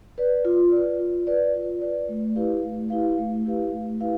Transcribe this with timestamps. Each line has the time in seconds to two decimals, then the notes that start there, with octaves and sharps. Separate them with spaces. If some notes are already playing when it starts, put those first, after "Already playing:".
0.18 B4 D5
0.45 F4
0.72 B4 D5
0.99 F4
1.27 B4 D5
1.54 F4
1.81 B4 D5
2.09 A3
2.36 E4 G4 B4 F5
2.63 A3
2.90 E4 G4 B4 F5
3.18 A3
3.45 E4 G4 B4 F5
3.72 A3
4.00 E4 G4 B4 F5